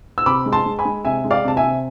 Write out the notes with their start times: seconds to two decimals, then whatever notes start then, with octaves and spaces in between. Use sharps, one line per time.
0.18 E6
0.26 C3 B5 D6
0.46 G#3
0.52 A5 C6
0.66 G#3
0.79 G#5 B5
0.85 G#3
1.05 C3 E5 G#5
1.24 G#3
1.31 D5 F5
1.44 C3 A5
1.57 E5 G#5
1.64 C3